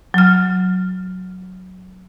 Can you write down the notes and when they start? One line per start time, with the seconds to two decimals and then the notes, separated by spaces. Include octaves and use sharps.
0.14 F#3 F6